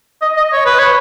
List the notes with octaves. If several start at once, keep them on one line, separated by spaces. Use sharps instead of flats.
D#5
D#5
C#5
B4
C#5